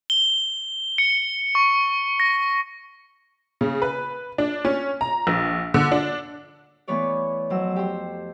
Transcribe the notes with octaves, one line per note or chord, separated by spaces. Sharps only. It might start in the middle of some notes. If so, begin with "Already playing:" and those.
G7
C#7
C#6
A#6
C#3
B4
D4
C#4
A#5
A#1
D3
D4
E3 A3 B3 B4 C#5 D5
F2 F#3 C5 E6
G4 C5